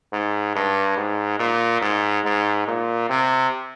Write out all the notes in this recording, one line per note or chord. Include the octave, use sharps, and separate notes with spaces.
G#2
G2
G#2
A#2
G#2
G#2
A#2
C3